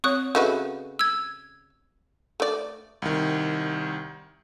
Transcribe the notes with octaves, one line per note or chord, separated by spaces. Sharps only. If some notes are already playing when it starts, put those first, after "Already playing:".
C4 C#5 C#6 D#6 F#6
C#3 F#4 A4 B4 D#5 E5
E6 G#6
A3 D5
C2 D#3